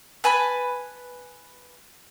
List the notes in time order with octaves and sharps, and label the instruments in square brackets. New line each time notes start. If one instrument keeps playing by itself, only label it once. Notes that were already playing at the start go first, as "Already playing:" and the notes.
[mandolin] B4 G#5 A5 B5